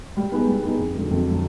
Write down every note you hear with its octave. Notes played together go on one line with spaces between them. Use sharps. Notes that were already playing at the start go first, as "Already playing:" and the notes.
G3
B3 D#4 G#4
G3
B3 D#4 G#4
F2
D3 F#3
F2
D3 F#3